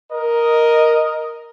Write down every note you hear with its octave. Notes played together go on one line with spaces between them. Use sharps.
A#4 D#5